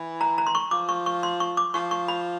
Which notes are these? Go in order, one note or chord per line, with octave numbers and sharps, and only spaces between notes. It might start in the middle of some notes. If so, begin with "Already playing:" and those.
Already playing: E3
A#5
A#5
C6
C#6
F3 D6
C#6
C#6
C6
C#6
D6
F3 C#6
C#6
B5